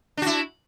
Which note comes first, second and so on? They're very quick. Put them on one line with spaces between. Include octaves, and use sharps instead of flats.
D4 F#4 E4